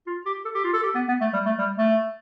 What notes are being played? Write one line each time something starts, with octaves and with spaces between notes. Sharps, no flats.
F4
G4
A4
G4
F4
A4
G4
B3
B3
A3
G3
A3
G3
A3